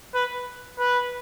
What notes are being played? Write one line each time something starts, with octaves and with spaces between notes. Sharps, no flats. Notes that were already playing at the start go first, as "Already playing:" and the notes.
B4
B4